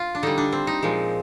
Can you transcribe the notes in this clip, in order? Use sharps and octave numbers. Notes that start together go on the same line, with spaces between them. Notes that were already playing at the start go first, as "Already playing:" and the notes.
Already playing: F4
D4
D3 G3 D#4
D4
C4
D#4
A#2 F3 G#3